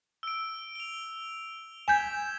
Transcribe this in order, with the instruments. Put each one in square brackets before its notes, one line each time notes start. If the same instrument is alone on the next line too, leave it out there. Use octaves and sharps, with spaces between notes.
[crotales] E6 D7
F7 G7
[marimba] G#5 G6 [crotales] G#6 B6 E7